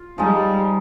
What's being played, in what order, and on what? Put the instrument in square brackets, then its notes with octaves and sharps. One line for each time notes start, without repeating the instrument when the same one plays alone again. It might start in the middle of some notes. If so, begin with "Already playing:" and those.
Already playing: [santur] F4
[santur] F3 G#3 D#4 [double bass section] G3